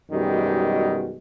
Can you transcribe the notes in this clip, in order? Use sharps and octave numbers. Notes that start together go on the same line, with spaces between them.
F#2 B2 D#3 G3 G#3